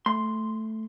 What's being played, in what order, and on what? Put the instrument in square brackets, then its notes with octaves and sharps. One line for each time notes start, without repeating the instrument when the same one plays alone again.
[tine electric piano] A3 [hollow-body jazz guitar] C6